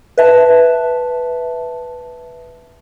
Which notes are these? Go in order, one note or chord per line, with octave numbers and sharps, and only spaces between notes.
B4 E5 A5